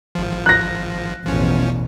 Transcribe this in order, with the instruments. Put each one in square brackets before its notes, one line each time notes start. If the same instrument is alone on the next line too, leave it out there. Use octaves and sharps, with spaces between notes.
[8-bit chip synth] G#1 F3
[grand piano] F#6 A#6
[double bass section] A1 E2 B2 [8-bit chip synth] F3 C#4